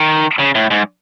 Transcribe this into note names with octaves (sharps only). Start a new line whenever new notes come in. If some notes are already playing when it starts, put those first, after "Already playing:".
Already playing: D#3
C#3
A2
G#2